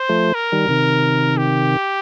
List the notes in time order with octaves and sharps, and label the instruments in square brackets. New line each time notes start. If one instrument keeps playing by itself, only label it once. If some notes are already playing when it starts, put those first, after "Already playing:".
Already playing: [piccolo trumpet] C5
[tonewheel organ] F3 A3
[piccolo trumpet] A#4
[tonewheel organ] D#3 G3
C3 D#3
[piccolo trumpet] G4